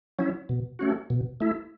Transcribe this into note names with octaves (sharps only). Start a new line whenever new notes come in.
F#3 C#4 E4
B2
A3 C#4 F#4
B2
A3 E4